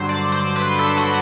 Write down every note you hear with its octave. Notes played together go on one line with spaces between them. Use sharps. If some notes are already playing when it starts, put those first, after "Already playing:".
Already playing: G2 D3 F#3 C5
D5
C5
B4
A4
F#4